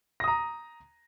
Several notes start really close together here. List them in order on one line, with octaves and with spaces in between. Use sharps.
A#6 D#6 A#5